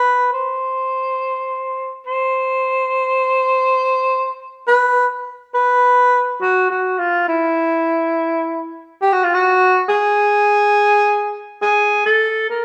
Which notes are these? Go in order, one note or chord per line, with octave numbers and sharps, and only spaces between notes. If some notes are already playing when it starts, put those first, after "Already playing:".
Already playing: B4
C5
C5
B4
B4
F#4
F#4
F4
E4
G4
F#4
F4
F#4
G#4
G#4
A4
A#4